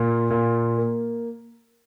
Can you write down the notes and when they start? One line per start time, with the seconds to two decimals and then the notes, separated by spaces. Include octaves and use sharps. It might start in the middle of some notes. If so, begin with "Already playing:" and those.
Already playing: A#2
0.30 A#2
0.78 A#3